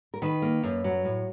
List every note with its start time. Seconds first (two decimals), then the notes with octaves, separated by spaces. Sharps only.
0.14 A#4
0.22 D#3 B4
0.42 A#3
0.63 F#2
0.84 F#3
1.05 A2